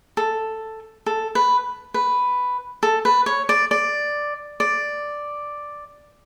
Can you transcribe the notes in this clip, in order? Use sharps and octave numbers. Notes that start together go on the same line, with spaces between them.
A4
A4
B4
B4
A4
B4
C#5
D5
D5
D5